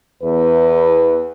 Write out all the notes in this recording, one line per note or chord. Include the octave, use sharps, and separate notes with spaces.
E2 B4